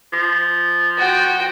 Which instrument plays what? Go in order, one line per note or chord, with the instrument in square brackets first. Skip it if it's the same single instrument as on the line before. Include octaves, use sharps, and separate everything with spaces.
[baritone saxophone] F3
[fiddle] F#4 G5